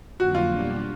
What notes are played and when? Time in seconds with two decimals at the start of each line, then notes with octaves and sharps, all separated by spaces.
0.19 F2 D3 F#3 A#3 F#4
0.35 F4
0.49 B2 G3 A#3 D4 G4